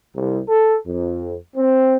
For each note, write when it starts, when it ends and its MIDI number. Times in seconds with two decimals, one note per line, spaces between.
0.14 0.38 36
0.48 0.76 69
0.86 1.35 41
1.56 1.96 60